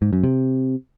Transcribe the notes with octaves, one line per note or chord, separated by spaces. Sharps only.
G#2
F#2
C3